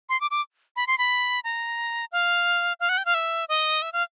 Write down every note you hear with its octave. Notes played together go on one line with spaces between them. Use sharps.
C6
D6
D6
B5
C6
B5
A#5
F5
F5
F#5
G5
F5
E5
D#5
E5
F5